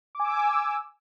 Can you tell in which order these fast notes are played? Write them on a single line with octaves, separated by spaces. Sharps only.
D6 G#5 E6